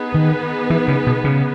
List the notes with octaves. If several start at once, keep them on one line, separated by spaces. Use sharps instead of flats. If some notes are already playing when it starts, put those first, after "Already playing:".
Already playing: B3 D#4 G#4 B4
D#3
E3
C#3
B2
C#3